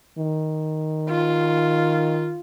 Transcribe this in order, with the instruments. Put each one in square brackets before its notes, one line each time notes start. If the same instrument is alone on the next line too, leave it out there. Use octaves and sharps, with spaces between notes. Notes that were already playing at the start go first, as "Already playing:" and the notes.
[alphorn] D#3
[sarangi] F4